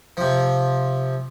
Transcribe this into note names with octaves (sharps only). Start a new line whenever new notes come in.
C3 F3